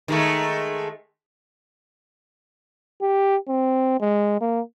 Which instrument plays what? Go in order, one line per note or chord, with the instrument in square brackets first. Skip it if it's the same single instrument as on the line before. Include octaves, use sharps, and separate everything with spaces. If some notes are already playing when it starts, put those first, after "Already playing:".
[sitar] D#3 G#3 A3
[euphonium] G4
C4
G#3
A#3